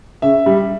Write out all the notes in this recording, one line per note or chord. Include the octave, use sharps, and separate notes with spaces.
C#3 E5
G3